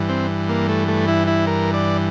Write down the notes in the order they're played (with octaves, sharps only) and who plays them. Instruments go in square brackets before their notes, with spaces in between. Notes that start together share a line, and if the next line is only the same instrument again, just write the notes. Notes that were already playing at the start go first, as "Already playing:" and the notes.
Already playing: [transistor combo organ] G2 E3
C4
A#3
A3
A3
E4
E4
A#4
D5